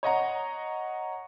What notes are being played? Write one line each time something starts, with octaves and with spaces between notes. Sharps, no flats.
C#5 D#5 F#5 A#5